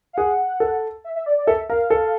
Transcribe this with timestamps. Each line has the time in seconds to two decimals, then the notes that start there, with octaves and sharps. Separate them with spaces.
0.13 F5
0.17 G#4 F#5
0.60 A4
1.04 E5
1.15 E5
1.26 D5
1.37 D5
1.47 A4 E5
1.69 A#4 F5
1.90 A4